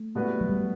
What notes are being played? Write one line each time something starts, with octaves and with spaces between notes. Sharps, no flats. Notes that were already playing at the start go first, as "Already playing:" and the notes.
Already playing: A3
A2 G3 B3 F#4 B4
F#3
G3